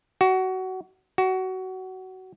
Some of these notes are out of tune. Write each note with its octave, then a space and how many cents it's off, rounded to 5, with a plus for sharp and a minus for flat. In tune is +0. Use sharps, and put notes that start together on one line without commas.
F#4 +20
F#4 +20